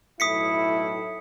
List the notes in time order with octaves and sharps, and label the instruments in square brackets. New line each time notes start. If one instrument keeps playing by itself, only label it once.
[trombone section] B1 A2 E4 [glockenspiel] D#6 B6 C#7